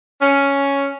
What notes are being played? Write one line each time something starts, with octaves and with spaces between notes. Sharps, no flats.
C#4